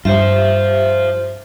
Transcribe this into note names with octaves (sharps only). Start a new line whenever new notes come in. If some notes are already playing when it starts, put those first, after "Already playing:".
G2 F4 G4 C5 E5